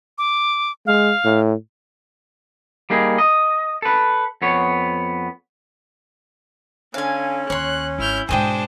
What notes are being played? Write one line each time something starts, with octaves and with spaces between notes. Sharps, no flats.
D6
G#3 F5
A2
G3 A#3 D#4 G#4
D#5
A4 B4
F2 B3 C#5
D3 C#4 F5 G#5
D#2 C#5 C6 F#6
G#1 E4 F6 G6
G#2 B2 G#3 D4 G#4 C5 D#5 G5